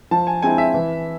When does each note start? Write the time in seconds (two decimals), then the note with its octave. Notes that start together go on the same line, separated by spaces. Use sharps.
0.11 F3 A5
0.27 G#5
0.43 G#3 C4 E4 G#5
0.58 E5
0.74 E3